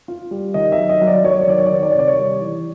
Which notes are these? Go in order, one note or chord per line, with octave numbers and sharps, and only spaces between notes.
F4
G3
D#3 D#5
E5
F#3
D#5
F#3
D5
F#3 C#5
D5
C#5
D#3 D5
C#5
D5
D#3 C#5
D5
C#5
C3 D5
C#5
G3
E3